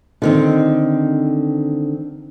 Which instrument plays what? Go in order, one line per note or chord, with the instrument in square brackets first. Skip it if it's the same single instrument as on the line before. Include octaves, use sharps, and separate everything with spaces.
[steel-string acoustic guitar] D3 D#3 C4